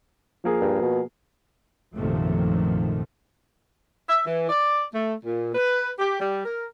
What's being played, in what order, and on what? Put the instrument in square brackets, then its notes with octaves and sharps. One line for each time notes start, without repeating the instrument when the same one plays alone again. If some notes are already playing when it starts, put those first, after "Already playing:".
[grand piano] F3 A#3 G#4
[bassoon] G2
B2
[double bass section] A#1 F#2 C3 D#3 F3 A3
[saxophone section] E5
E3
D5
A3
A#2
B4
G4
G3
A#4